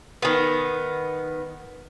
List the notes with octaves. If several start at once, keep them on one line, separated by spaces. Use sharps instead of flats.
D#3 B3